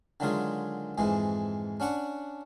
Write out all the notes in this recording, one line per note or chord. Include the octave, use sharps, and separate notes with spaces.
D3 D#3 F#3 G#3 F4 G#4
F2 G#2 E3 G#3
C#4 D4 F#5 C#6